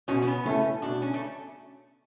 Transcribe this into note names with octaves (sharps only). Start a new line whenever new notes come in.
B2 C#4
C#4
B3
A3 C#4 E4 A4
B2 D4
C#4
A3